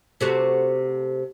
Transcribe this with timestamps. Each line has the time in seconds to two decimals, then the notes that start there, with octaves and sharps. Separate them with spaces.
0.21 C3 A3 F#4